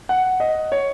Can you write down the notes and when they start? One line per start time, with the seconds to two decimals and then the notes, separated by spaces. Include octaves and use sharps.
0.09 F#5
0.40 D#5
0.72 C#5